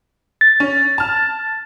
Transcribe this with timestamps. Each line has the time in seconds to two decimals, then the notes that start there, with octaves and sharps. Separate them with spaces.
0.41 A6
0.60 C#4
0.98 A5 F6